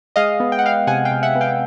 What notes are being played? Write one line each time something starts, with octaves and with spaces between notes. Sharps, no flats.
G#3 D#5 F5
B3
G5
F#5
B3 F5 G5
C3 F#5 G#5
F5 G5
C3
E5 F#5
B3
F5 G5